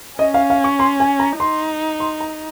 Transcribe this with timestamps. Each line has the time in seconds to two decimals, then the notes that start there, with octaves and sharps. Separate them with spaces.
0.19 C#4 D#5
0.34 F5
0.50 F5
0.64 C#6
0.79 C6
1.00 G#5
1.20 A#5
1.40 D#4 C6
2.00 C6
2.20 A#5